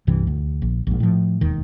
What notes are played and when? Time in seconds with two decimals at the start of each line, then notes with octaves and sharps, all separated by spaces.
0.07 C2 G2 C3 E3
0.27 D2
0.62 A#1
0.87 A#1 G#2
1.00 A2 F3
1.41 E1 D#2 D#3